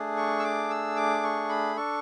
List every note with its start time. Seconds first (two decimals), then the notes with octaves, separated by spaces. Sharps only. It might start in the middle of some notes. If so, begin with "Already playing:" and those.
Already playing: A3 D4 G#4
0.17 C#6
0.39 E6
0.44 D6
0.70 E6
0.96 D6
1.23 C#6
1.49 B5
1.76 D4 A4 C#6